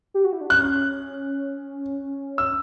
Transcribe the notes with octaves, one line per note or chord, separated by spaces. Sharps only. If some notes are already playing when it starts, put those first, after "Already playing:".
G4
F#4
E4
D4
C#4 F#6
E6